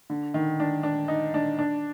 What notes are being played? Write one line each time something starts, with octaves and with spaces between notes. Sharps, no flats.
D3
D#3
D4
D4
D#4
D4
D4